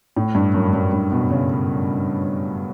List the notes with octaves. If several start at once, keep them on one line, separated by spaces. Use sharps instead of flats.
A2
G2
F#2
F#2
G2
B2
C#3